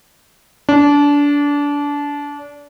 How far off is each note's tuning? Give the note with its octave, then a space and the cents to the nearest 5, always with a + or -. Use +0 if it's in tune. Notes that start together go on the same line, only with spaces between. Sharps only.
D4 -25